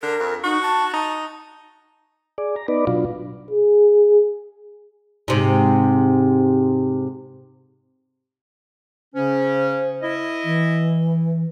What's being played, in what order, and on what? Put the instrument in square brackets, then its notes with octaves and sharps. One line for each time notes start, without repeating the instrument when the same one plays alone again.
[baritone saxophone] D3 [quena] A#4
[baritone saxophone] F2
[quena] D#4 [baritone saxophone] F#4
[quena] A5
[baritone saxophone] D#4
[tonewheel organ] G#4 D5
A#5
B3 D#4 B4 D5
B2 F#3 D4 F4
[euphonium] G#4
[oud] G#2 C3
[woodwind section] C#3 C#4 [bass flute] C5
[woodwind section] E4 D#5
[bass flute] E3